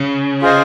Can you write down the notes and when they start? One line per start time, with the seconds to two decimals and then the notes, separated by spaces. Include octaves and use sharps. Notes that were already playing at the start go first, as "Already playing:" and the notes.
Already playing: C#3
0.42 F4 G#4 C5 D#5 G#5